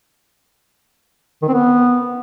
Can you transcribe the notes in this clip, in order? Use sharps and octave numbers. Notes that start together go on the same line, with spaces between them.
D#3
C4
B3